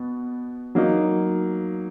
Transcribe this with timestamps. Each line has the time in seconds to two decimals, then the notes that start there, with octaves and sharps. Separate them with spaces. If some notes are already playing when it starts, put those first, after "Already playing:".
Already playing: B2 B3
0.75 F#3 A#3 D#4